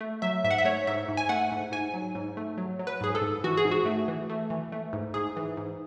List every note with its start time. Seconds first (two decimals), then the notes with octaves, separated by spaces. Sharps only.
0.01 A3
0.22 F#3 E5
0.44 G#2 E5
0.51 F#5
0.58 E5
0.65 A3 C#5
0.87 G#2 E5
1.08 G#2
1.17 G#5
1.29 A3 F#5
1.52 G#2
1.72 G#2 G#5
1.94 F#3
2.15 G#2
2.37 A3
2.58 F#3
2.79 F#3
2.87 B4
3.01 G#2 G#4
3.15 A4
3.21 G#2
3.44 E3 F#4
3.57 G#4
3.65 G#2
3.71 F#4
3.86 A3
4.08 E3
4.30 A3
4.50 E3
4.72 A3
4.93 G#2
5.14 G#2 G#4
5.37 E3
5.57 G#2